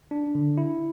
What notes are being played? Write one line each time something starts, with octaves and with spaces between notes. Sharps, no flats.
D4
D3
E4